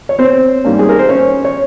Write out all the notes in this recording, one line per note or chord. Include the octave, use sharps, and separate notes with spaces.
C#5
C4 C5
G#2 G3 A#3 C#4
G#4
A#4
C5
C#4 C#5
C#5